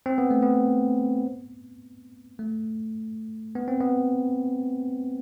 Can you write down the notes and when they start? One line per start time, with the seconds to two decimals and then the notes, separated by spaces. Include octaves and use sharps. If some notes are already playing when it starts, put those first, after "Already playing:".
0.06 C4
0.18 B3
0.31 A3
0.42 B3
2.39 A3
3.55 B3
3.68 C4
3.80 B3